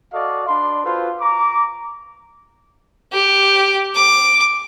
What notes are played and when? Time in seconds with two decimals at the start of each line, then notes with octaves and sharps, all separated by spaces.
0.13 F#4 A4 D5 D#5 F5
0.47 D4 B5 C6
0.83 F4 F#4 A4 B4 C5
1.20 A#5 C#6 D6
3.13 G4
3.95 D6